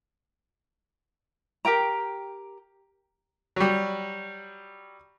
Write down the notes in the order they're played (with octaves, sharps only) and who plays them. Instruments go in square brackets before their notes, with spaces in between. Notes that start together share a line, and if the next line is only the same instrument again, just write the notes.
[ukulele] G4 A#4 G5 A#5
[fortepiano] F#3 G3